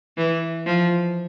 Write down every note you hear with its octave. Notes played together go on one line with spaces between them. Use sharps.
E3
F3